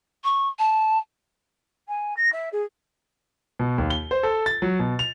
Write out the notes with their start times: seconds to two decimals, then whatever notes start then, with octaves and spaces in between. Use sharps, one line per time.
0.24 C#6
0.59 A5
1.88 G#5
2.16 A#6
2.32 E5
2.52 G#4
3.59 B2
3.78 D#2
3.90 G7
4.11 C5
4.23 A4
4.46 A6
4.62 F#3
4.79 B2
4.99 F7